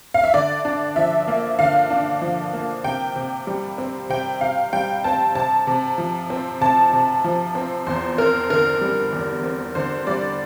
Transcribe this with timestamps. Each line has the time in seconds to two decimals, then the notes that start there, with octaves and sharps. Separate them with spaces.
0.14 F5
0.24 E5
0.34 D3 D5
0.65 D4
0.96 F3 E5
1.28 A#3
1.59 D3 F5
1.90 D4
2.22 F3
2.54 A#3
2.84 C3 G5
3.16 C3
3.47 G3
3.78 C4
4.10 C3 G5
4.41 C3 F5
4.73 G3 G5
5.04 C4 A5
5.35 C3 A5
5.67 C3
5.98 F3
6.30 C4
6.61 C3 A5
6.93 C3
7.24 F3
7.55 C4
7.87 E2 C5
8.18 C4 A#4
8.50 D3 A#4
8.81 G3
9.13 E2
9.43 C4
9.75 D3 C5
10.07 G3 D5